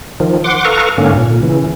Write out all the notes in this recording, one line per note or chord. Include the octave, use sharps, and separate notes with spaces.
D#3 F3
F#5 C6 D6
A4 B4 F5 A#5 C#6
G#2 D3 A#3 C#4
A#2
C#3 E3